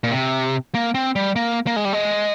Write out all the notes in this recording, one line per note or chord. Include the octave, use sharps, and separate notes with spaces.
A#2
C3
A#3
C4
G3
A#3
A#3
G#3
G3
G#3